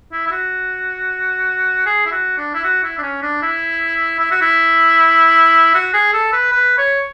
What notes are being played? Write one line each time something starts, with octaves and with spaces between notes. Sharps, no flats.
E4
E4
F#4
G#4
E4
F#4
D4
E4
F#4
E4
D4
C#4
D4
E4
E4
F#4
E4
F#4
G#4
A4
B4
B4
C#5